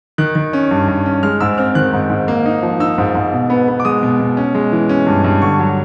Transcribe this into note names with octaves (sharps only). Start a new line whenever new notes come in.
D#3 F#6
D#3
C#4
G2
G2
C#4
G#3 F6
G#2 E6
C4 F6
D#3 F#6
G#2
G#2
A#3
D#4
F3
D#4 E6
G#2
G#2
B2
B3
B3
D6
G#3 D#6
B2
B2
C#4
G#3
E3
C#4
G2
G2
D3 C#6
F#3